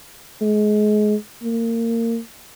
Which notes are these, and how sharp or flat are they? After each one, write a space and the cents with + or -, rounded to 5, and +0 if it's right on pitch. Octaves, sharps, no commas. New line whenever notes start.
G#3 +25
A#3 -25